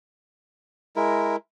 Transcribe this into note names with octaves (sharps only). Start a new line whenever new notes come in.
G#3 E4 A#4